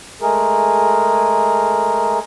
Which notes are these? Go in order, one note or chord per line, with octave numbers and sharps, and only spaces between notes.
G#3 A3 G#4 A#4